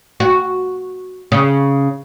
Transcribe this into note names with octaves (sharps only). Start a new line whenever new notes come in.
F#4
C#3